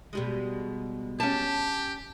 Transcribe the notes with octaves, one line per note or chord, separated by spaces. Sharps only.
B2 G3 G#3
C#4 G4 A5